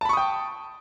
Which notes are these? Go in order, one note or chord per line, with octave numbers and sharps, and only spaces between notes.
G5 A5 B5 C#6 D#6